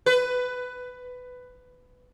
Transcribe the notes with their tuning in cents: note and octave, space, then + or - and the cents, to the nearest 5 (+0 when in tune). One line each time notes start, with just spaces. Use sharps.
B4 +15